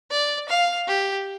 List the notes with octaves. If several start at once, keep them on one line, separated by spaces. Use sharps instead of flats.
D5
F5
G4